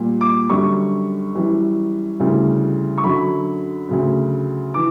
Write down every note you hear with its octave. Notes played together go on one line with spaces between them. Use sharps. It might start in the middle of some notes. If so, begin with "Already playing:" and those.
Already playing: A#2 G3
D6
F#2 D3 G3 C#6
F#2 E3 G3
D2 C#3 E3 G3
C#6
F#2 D3 F#3 B5
D2 C#3 F#3
E3 D6